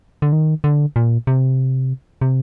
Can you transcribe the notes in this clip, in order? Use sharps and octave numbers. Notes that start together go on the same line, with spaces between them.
D3
D#3
D3
A#2
C3
C3